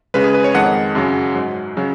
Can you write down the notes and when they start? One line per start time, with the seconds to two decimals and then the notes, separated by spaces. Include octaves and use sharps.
0.14 C#2 C#3 G#3 B4
0.24 G#4
0.34 B4
0.44 C#5
0.54 F2 D#3 G#3 F#5
0.95 F#2 C#3 F#3
1.35 G#2 F#3
1.77 C#3 F#3